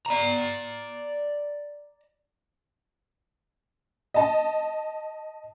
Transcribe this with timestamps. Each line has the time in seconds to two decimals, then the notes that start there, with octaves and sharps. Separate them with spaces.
0.06 D5 A#5
4.14 D#5 A5